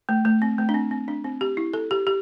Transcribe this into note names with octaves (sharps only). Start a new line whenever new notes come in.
A3
A3
C4
A3
D4
C4
C4
D4
C4
G4
E4
A4
G4
G4